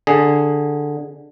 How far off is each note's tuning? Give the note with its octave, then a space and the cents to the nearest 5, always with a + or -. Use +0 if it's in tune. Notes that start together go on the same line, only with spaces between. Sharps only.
D3 +5 G#4 +0